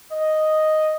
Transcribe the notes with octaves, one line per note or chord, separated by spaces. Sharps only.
D#5